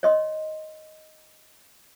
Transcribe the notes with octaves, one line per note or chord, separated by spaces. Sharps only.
C#5 D#5 C6